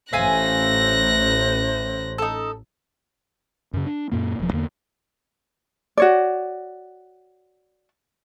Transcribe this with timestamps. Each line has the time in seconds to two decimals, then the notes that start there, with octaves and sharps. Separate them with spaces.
0.13 A1 C5 E5 F5 G#5 F#6 A#6
2.18 D#4 A4
3.73 F#2 C#3
3.86 D4
4.12 F#2 A#2 A#3
4.39 E1 F3
4.53 E2 D3 A#3
5.97 F#4 C#5 D5